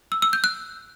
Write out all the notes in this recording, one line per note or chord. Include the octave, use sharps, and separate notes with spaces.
E6
E6
G6
F#6